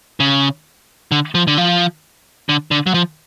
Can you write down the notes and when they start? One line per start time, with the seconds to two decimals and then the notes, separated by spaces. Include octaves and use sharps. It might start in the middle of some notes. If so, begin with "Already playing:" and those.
0.20 C#3
1.12 D3
1.35 F3
1.47 D3
1.58 F3
2.49 D3
2.71 D3
2.86 F#3
2.94 F3